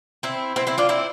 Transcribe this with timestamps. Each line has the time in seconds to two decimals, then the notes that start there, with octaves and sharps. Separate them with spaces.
0.23 C4 E4
0.56 C4 E4
0.67 C4 E4
0.78 D4 F4
0.89 C4 E4